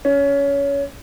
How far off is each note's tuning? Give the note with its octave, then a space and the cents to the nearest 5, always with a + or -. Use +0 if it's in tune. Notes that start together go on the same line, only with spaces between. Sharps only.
C#4 +20